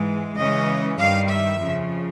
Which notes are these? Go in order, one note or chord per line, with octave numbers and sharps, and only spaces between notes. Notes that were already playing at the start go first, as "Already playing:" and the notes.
Already playing: G#2 E3 G#3
C#3 E3 G#3 C#4 D#5
G2 D#3 G3 F5
E5
F2 C#3 F3